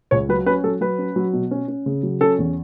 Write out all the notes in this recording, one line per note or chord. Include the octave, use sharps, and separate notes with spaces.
C#2 C#5
F#3 B4
C#4 B4
F#3 A4
F#3 B4
C#4
F#3
B2
C#4
C#4
C#3
F#3
C#4 A4
E2